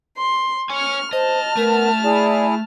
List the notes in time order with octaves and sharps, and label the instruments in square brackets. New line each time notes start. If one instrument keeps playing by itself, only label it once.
[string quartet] C6
[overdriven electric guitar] C#5 G#5 [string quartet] C#6 F6
[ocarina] C5 [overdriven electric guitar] D#5 [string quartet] A5 F6
[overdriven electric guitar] A3 [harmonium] B3 [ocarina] A#4
[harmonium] E4 G#4 [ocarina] D5